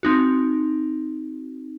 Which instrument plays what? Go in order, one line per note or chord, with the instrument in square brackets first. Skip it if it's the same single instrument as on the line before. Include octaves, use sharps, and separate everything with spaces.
[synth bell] C4 D#4 F#4